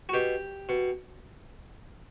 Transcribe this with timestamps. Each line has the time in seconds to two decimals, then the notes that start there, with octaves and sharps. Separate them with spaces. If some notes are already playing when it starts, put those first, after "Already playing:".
0.09 F#4
0.13 B2 G4
0.69 B2